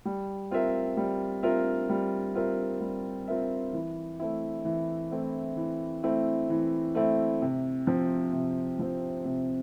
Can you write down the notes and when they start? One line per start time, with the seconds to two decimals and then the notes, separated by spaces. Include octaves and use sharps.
0.05 G3
0.51 C4 F4 A#4 E5
0.97 G3
1.43 C4 F4 A#4 E5
1.90 G3
2.35 C4 F4 A#4 E5
2.81 G3
3.28 C4 F4 A#4 E5
3.73 E3
4.20 A3 C4 E4
4.65 E3
5.11 A3 C4 E4
5.57 E3
6.03 A3 C4 E4
6.50 E3
6.95 A3 C4 E4
7.42 C3
7.87 F3 C4
8.33 C3
8.79 F3 C4
9.25 C3